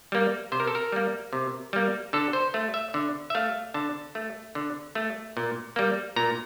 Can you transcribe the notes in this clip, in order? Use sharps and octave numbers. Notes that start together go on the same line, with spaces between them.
G3 A#3
C3 C5
A#4
A4
A#4
G3 A#3
C3
G3 A#3
D3 A4
C5
A3
E5
D3
E5
A3 F5
D3 A5
A3
D3
A3
A#2
G3 A#3
A#2 A#5